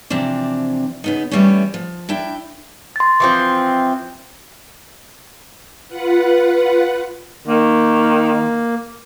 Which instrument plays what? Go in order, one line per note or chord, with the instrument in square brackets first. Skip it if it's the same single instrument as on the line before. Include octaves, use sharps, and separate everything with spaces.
[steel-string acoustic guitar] C3 E3 F3 C4 D4
C#3 B3 D#4
E3 F3 G3 A3 B3 C#4
F3
D4 E4 G5
[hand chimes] C6 A6
[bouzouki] E3 F3 C4
[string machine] F4 B4 F#5
[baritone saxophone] D#3 [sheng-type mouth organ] A#3